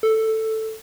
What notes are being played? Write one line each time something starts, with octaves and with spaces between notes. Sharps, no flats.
A4